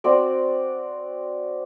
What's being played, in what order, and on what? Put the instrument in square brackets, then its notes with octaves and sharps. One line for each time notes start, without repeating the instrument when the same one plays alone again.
[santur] C4 F#4 D5